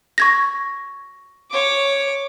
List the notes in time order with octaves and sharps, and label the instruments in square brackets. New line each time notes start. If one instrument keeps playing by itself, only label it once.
[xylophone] C#6 G#6 A#6
[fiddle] C#5 D6